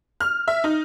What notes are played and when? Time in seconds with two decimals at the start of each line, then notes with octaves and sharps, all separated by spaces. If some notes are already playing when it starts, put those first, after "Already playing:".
0.20 F6
0.48 E5
0.64 D#4